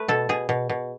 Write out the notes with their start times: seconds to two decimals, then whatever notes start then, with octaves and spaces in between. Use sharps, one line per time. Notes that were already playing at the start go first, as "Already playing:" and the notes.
Already playing: A3 B4
0.08 B2 A4
0.29 B2 G#4
0.49 B2
0.69 B2